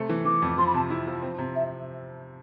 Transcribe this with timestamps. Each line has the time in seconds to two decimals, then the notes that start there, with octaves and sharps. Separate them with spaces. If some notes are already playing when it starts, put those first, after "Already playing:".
Already playing: C3 A3
0.10 E3
0.25 E3 D6
0.42 F2
0.58 F3 C6
0.67 B5
0.74 C3 A5
0.90 E4
1.07 F3
1.22 C4
1.38 C3
1.56 E5